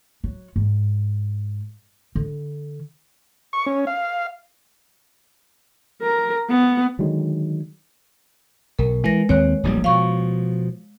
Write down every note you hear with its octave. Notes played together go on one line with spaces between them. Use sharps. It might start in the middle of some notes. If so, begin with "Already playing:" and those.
F#3
G#2
D3
C#6
C#4
F5
A#4
B3
D3 D#3 F#3 G#3
B1 A#4
E3 G#3 B4 A#6
D#2 C4 C#5 F#6
D1 A#1 G3
B2 F3 F5 C#6